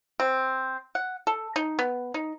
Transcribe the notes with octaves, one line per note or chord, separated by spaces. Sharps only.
C4
F#5
A4
D#4
B3
D#4